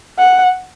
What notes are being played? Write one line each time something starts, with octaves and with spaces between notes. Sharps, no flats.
F#5